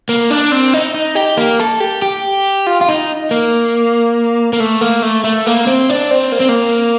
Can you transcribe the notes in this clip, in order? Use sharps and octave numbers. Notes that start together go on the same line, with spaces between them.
A#3
D4
C4
D#4
D#4
G4
A#3
A4
G4
G4
F4
F4
D#4
A#3
A#3
A3
A#3
A3
A3
A#3
C4
D4
C4
A#3
C4
A#3